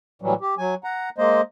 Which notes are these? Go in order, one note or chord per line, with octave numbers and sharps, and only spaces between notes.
A2 E3 F#3 G3
G4
F#3 G#5
F#5 A#5
G#3 A#3 C5 D#5